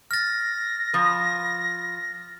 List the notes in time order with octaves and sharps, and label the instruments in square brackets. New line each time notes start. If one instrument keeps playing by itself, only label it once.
[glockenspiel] F6 A6 [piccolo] A#6
[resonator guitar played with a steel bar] F3 B4